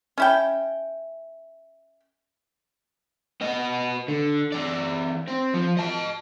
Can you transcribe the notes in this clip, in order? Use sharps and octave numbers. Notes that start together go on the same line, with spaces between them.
C#4 E4 G5
B3 D#5
D3
E3 D5
C4
F3
D#5 A5